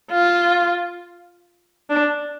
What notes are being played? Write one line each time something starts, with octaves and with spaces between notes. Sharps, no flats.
F4
D4